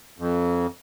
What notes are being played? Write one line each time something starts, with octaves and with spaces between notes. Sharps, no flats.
F2